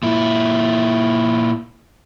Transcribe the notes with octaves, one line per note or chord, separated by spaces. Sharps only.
A#2 E4